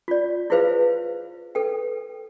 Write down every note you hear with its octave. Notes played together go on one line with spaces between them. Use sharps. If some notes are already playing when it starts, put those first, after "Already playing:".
F4 D5
E4 F4 G#4 B4 C5 F5
A4 B4 G5